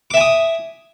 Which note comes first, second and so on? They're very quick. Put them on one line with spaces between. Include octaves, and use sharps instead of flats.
D6 E5 G#5 D#6